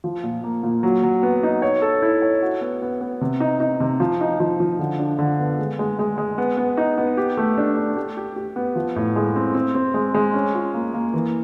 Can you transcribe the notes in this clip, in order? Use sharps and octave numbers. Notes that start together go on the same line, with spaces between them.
F3
A#2
A#3
A#2
F#3
F#3
B3
D#4
C#5
A4
E4
C#5
F#4
B3
B3
B3
C3
D#4
D#4
C3
F3
D#4
F3
F3
D3
D4
D3
B3
G#3
G#3
G#3
G#3
B3
B3
D#4
B3
G4
A3
D4
A3
G4
G4
G4
B3
F3
A2
G#3
C4
C4
C4
G#3
G#3
C#4
F4
A#3
A#3
E3